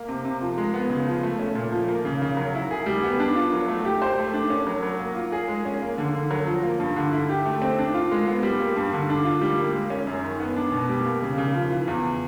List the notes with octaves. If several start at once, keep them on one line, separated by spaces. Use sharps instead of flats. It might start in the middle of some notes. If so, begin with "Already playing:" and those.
Already playing: A#3
C3
C3
F3
G#3
B3
C#3
F3
A3
C#4
A#2
F3
A#3
C#3
C#3
F#3
E4
G#4
G3
B3
D4
F4
F#3
A3
G4
C5
A3
D4
C#4
F#3
F#3
A#3
F4
G#4
G#3
C#4
A#3
D3
D3
F#3
F3
A#3
G2
D3
E4
G4
A3
C4
D4
F4
G#3
B3
G3
A#3
G2
D3
D4
F4
G3
A#3
G#3
C#4
F#2
D#3
B3
D4
B2
G3
A#3
C#3
C#3
F3
E3
E2